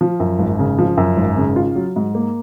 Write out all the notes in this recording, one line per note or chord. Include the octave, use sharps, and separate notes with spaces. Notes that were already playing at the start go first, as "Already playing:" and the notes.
F3
F#2
G#1
C#3
F3
F#2
G#1
C#3
F4
F#3
G#2
A#3